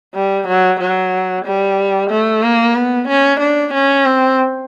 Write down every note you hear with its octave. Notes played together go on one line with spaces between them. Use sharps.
G3
F#3
F#3
G3
A3
A#3
B3
C#4
D4
C#4
C4